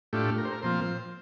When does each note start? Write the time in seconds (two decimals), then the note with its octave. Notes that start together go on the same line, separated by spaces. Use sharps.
0.13 A2 A3 D4 F4 G4
0.38 A#4
0.45 C5
0.52 A#4
0.62 A#2 F3 C4 F4 C5